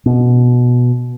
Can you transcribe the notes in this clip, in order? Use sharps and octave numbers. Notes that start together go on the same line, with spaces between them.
B2